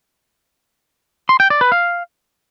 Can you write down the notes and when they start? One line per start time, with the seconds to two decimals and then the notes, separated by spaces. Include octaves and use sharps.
1.29 C6
1.40 G5
1.50 D5
1.61 B4
1.72 F5